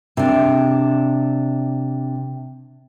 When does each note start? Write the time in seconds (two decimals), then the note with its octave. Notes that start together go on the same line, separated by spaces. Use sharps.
0.17 C3 D4